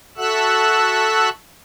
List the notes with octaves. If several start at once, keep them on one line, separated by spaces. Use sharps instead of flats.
F#4 A4 E5 F#5 E6 F#6